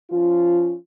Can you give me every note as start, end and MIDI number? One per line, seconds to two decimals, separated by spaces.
0.11 0.75 53
0.11 0.75 61
0.11 0.75 65